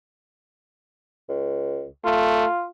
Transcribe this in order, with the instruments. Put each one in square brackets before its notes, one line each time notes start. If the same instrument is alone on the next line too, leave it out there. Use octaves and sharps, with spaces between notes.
[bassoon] C#2
[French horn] A3 [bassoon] F4